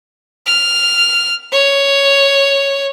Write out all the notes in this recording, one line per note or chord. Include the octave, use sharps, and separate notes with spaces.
F6
C#5